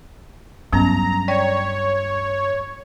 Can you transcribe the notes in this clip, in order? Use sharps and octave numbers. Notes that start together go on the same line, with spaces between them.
G2 F#3 B3 C#4 A#5
C#5 D5 G5